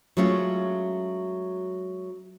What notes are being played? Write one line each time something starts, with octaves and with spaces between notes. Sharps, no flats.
F#3 G#3 A3 C#4 F4